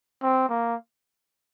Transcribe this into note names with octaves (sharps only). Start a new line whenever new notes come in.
C4
A#3